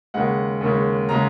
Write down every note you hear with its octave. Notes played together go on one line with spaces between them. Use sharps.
D#2 C#3 G#3 F#5
D#2 C#3 G#3
C#3 G#3 A#5